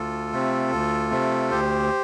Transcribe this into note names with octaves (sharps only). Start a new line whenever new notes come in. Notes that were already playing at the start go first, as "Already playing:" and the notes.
Already playing: D2 F4 A4
C3 A3 C4
D2
C3 A3 C4
D2 G4 C5